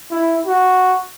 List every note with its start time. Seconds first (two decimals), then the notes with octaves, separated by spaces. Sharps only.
0.11 E4
0.47 F#4